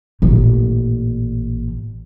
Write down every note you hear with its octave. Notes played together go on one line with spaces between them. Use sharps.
A1 A#2